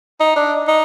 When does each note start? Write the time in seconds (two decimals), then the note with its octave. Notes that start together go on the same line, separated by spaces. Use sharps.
0.20 D#4
0.36 D4
0.68 D#4